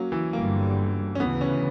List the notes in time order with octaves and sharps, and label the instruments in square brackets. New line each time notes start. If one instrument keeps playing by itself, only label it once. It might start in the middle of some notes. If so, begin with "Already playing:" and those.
Already playing: [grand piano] F#3 A#3 C#4
E3
[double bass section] G1 G2 D3 G3 [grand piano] A#3
[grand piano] C#4
[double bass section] D2 C#3 E3 [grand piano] B3
[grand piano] C#4